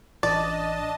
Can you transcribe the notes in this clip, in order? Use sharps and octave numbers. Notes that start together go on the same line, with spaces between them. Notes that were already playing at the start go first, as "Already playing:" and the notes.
A1 D4 D5 D#5 A5 A6